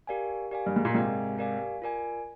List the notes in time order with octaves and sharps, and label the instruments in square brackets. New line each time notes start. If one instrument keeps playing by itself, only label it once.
[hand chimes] G4 A#4 D5 F5 G#5
G4 A#4 D5 F5 G#5
[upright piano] G2
G#2
A#2
[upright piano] G#2 C3 [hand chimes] G4 A#4 D5 F5 G#5
[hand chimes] G4 A#4 D5 F5 G#5
F4 A#4 D5 G#5